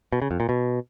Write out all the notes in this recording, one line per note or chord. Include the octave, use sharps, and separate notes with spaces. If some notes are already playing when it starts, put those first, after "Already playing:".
B2
C#3
F2
A#2
B2